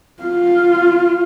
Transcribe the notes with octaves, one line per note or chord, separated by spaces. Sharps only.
F4